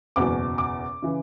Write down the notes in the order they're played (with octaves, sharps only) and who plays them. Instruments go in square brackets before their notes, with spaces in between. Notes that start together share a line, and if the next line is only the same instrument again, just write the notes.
[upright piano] F#1 E2 B2 D6
D6
C#3 E3